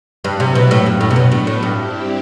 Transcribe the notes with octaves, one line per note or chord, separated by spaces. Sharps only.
G2 F#3 C4 E4 B4
C3
B2
F#2 A2 F#3 B3
G2
A2
C3
B2 F#3 B3 D4 F#4
A2
A2
G2 G3 C4 E4 G4